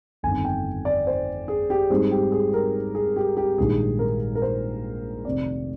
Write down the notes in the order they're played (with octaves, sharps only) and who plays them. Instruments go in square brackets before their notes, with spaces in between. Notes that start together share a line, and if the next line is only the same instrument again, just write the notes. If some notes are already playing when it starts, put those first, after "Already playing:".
[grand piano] G1 F2 D#3 G#5
G5
D5
C5
G#4
G4
G#2 G3 C4 D#4 G#4
G4
G#4
A#4
G#4
G4
G4
A#1 G#2 D#3 G3 G#4
A#4
A#4
C5
F1 F2 C3 D#3 D5